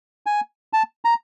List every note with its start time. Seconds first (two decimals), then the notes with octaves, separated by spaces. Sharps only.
0.26 G#5
0.73 A5
1.05 A#5